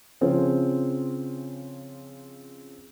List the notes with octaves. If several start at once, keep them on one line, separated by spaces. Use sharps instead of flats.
C#3 F3 C4 C#4